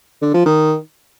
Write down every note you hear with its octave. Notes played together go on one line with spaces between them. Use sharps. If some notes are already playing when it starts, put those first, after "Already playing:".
D3
F3
D#3